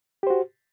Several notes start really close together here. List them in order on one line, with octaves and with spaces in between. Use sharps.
G4 C5 F#4